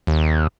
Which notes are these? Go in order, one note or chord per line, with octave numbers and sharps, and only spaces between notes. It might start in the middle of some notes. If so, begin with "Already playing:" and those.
D#2